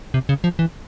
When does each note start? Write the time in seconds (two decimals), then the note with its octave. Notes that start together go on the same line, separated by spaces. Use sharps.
0.14 C3
0.29 C#3
0.44 F3
0.59 E3